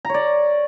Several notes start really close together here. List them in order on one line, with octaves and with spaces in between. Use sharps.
A#5 C#5 D5